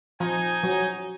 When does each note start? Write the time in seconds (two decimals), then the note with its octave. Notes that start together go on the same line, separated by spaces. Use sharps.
0.20 F3 D#4 G#5
0.63 F#3